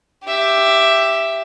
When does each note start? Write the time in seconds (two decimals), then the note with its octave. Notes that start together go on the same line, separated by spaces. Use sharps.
0.25 G4 E5